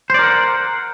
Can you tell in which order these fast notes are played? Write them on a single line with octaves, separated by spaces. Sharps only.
C5 D5 A#4 F#5